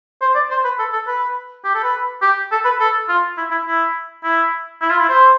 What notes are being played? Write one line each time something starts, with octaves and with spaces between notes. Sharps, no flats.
C5
D5
C5
B4
A4
A4
B4
G4
A4
B4
G4
A4
B4
A4
F4
E4
E4
E4
E4
E4
F4
E4
C5